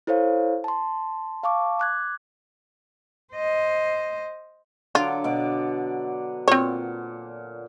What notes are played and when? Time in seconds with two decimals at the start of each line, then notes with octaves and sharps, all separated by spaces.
0.07 E4 A4 C5 C#5 F5
0.64 A5 C6
1.43 F5 A5 C#6 D6
1.79 D6 F#6 G#6
3.34 C5 D#5
4.95 D3 F#3 F4 D6
5.24 B2 D5 D6
6.48 A#2 C4 C#5